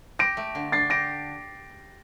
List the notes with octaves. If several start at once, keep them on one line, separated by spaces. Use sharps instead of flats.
G4 A#6 D7
A3
D3
D4 A6 C7
G4 A#6 D7